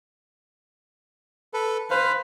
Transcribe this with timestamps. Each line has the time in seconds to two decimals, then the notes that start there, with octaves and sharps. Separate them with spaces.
1.54 A4 B4
1.91 B4 C5 F5